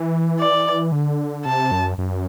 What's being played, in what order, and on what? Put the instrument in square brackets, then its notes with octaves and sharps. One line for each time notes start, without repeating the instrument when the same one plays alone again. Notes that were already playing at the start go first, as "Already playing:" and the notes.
Already playing: [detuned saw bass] E3
[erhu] D5
[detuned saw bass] D3
[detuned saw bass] C3 [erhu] A5
[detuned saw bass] F#2
F#2